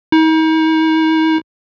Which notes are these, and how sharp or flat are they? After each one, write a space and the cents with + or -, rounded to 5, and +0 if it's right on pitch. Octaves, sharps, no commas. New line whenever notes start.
D#4 +40